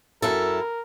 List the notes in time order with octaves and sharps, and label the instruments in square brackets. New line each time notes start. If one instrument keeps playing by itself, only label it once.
[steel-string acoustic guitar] F#2 E4 A4 [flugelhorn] A#4